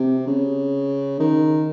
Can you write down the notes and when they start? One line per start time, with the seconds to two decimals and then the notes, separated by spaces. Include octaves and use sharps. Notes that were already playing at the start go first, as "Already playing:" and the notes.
Already playing: C3
0.27 C#3
1.20 D#3